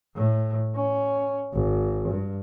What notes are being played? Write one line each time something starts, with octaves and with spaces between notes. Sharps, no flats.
A2
C#4
G#1
G2